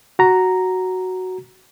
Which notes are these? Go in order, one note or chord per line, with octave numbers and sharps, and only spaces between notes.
F#4 A#5